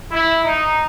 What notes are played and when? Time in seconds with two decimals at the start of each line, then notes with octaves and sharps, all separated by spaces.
0.12 E4
0.44 D#4